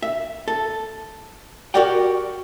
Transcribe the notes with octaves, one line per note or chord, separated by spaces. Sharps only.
E5
A4
F#4 G4 A#4 D5 F#5 G5